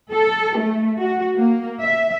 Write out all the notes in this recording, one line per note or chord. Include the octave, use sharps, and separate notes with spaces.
A4
A3
F#4
A#3
E5